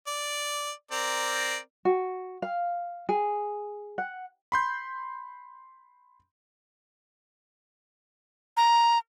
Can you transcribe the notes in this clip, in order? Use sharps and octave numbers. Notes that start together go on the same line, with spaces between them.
D5
C4 A#4 D5
F#4
F5
G#4
F#5
B5 C6 G6
A#5